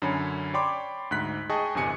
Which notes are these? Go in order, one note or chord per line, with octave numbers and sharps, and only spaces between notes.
F#2 D3 C#4 C#5 B5
C#5 D5 G5 B5 C6 D6
D2 G#2 F#6 B6
G#4 D#5 G5 A5 C#6 D#6
G1 E2 C3 G#5 C#7